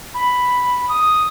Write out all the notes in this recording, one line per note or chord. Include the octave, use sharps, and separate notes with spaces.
B5
D#6